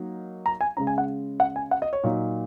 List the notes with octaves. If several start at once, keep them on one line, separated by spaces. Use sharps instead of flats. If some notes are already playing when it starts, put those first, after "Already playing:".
Already playing: F#3 A#3 D#4
A#5
G#5
C#3 G#3 C#4 A#5
G#5
F#5
F#5
G#5
F#5
D#5
C#5
A#2 F#3 D#4